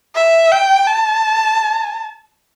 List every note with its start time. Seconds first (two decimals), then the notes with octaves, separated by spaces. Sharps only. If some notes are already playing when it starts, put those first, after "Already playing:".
0.15 E5
0.52 G5
0.87 A5